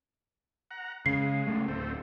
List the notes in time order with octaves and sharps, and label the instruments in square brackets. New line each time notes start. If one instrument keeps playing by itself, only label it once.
[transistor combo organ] F#5 A#5
[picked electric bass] C#3 [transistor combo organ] G#3 [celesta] C7
[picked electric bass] C#3 A3
[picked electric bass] D1 [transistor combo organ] A3 C4